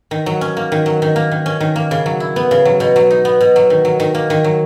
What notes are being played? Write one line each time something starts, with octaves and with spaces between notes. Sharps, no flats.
D#3
F#3
C#4
A#3
D#3
F#3
D#3
A#3
D#3
C#4
D#3
A#3
C#3
F#3
E4
B3
C#3
F#3
B2
F#3
D#4
B3
B2
F#3
D#3
F#3
D#3
A#3
D#3
F#3